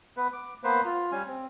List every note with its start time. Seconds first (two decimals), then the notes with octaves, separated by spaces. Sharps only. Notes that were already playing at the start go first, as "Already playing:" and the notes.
0.17 B3 B4
0.33 D6
0.64 A#3 B3 B4 C5
0.85 F4
1.12 G3 C#4 G#5
1.27 C4